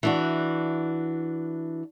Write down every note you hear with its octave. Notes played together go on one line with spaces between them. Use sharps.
E3 D4 F#4